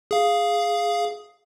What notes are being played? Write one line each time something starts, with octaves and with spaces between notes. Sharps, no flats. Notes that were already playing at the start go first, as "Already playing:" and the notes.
G#4 F5